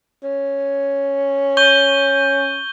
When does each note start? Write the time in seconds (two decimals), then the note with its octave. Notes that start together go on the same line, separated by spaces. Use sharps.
0.24 C#4
1.57 C#6 G6 G7